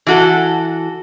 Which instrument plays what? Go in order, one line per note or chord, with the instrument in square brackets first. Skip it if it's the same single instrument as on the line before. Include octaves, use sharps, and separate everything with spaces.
[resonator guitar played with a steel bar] E3 F#4 A4